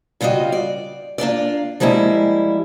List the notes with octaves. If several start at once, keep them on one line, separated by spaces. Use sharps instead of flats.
C#3 G3 F4 F#4 D#5
D5
A#3 D4 F4 D5
F3 G3 G#3 A#3 E4